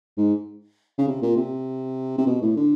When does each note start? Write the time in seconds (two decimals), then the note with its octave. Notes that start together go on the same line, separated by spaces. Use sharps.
0.17 G#2
0.98 C#3
1.08 C3
1.22 A#2
1.37 C3
2.18 C3
2.27 B2
2.42 A2
2.57 D3